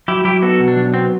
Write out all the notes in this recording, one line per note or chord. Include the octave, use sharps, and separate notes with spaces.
F#3 E4 G4
F#3 E4 G4
B3 F#4 A4
B2
D4
F#3
B3 C4